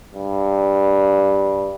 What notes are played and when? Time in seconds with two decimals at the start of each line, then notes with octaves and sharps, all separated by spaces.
0.14 G2